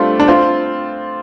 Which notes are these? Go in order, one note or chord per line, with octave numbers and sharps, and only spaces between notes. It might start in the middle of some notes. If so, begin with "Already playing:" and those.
Already playing: G3 A3 C4 D4 F4
D4
C4 F4